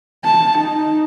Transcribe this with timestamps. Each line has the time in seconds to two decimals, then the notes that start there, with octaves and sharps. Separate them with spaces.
0.25 A5
0.58 D#4